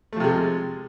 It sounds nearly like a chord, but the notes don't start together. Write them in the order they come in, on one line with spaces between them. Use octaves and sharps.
A3 F3 C3 G#3